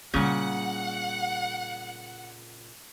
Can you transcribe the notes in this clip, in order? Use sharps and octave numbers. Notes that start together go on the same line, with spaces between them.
A#2 C#3 G3 B3 F#5